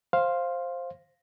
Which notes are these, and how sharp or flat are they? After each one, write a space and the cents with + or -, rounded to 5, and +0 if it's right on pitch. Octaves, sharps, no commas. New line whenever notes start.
C5 +10 F5 +0